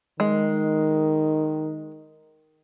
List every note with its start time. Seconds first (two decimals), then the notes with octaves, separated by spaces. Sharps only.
0.20 D#3 G#3